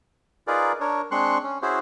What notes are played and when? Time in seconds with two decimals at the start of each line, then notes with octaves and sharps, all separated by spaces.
0.47 D#4 F4 G#4 A#4 B4 D5
0.80 D4 A#4 C#5
1.11 G#3 C4 D4 C6 C#6 F#6
1.43 C#4
1.62 C#4 E4 F#4 G#4 C5